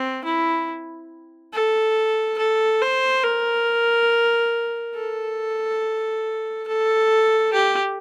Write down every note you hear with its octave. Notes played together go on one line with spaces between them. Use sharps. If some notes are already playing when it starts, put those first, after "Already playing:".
Already playing: C4
E4
A4
A4
C5
A#4
A4
A4
G4